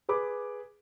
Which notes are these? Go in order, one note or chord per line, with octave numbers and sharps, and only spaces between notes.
G#4 B4 B5 D6